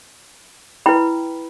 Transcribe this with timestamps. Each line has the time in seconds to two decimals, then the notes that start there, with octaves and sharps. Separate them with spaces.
0.86 E4 B4 G5 B5